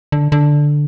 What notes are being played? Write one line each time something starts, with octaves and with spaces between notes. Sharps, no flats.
D3
D3